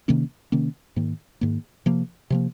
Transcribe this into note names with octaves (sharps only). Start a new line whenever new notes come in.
C3 D#3 A#3 C#4
C3 D#3 A#3 C#4
G#2 D#3 A#3
G#2 D#3 A#3
C3 F3 A#3
C3 F3 A#3